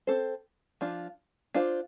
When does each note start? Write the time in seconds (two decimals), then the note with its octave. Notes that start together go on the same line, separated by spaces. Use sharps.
0.07 C4 A4 C5
0.81 F3 D4 F4
1.54 D4 F4 C5